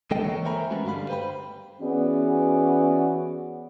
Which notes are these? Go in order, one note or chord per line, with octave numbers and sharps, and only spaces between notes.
D3 G#3 A4 D#5 G5
E3 A#3 A4 A#4 C#5
A#4 C5 E5 G#5 A#5 B5
G#3 A3 B3 C#4 F#4
G2 D3 G3 F5 B5
B4 C5 F#5 G5 B5
E3 B3 C#4 F#4 G#4 D5